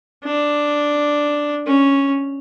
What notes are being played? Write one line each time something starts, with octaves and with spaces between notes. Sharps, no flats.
D4
C#4